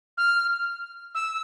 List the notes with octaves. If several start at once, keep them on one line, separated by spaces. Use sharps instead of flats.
F6
E6